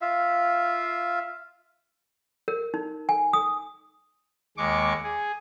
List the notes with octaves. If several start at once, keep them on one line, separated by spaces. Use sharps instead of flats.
F4 E5 F5
A#4
D#4
G#5
D#6
D#2 G#3 C#6 D6
G#4